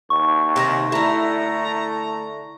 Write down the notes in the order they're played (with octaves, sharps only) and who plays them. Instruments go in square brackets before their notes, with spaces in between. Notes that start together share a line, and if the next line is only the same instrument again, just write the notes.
[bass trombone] D#2 [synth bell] C#6
[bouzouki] C3 D#3 A#5
[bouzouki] D3 E4 [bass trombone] A3 [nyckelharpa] A#5